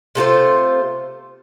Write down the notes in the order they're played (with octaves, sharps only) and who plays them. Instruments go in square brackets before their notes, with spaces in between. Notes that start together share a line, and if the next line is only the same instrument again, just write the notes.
[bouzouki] C3 A3 F4 C5